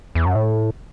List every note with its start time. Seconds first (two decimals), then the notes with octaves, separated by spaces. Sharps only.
0.15 E2
0.26 F#2
0.35 A2